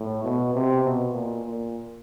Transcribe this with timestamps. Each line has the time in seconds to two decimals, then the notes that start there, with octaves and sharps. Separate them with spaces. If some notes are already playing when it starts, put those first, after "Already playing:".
Already playing: A2
0.24 B2
0.54 C3
0.84 B2
1.14 A#2
1.45 A#2